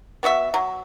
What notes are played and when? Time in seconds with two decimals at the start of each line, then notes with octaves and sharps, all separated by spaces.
0.23 B3 F#4 D#5 E5
0.54 F#3